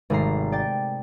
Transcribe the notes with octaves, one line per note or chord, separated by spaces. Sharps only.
G#1 C3 A3 C4 A#5 C7
D5 G5 A6